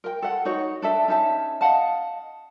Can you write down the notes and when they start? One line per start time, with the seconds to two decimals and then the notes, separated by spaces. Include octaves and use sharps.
0.04 A#4 G5
0.22 A4 F#5
0.45 D#4 F#4 C#5
0.82 D4 A4 E5
1.08 C#4 D#4 E5 A5
1.61 D#5 F5 F#5 A5